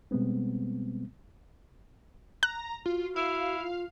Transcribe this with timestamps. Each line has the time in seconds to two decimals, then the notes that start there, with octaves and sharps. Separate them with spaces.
0.11 B2 G3 G#3 B3 C4
2.43 A#5 F#6
2.86 F4 F#4
3.16 E4 F5
3.61 F4